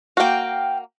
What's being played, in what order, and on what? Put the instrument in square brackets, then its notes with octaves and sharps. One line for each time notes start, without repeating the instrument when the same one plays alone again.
[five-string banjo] A#3 F#4 [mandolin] F5 G5